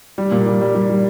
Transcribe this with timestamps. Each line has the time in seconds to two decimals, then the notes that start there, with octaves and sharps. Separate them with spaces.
0.18 G3
0.31 A#2
0.46 G3
0.61 G3
0.75 G3
0.90 G3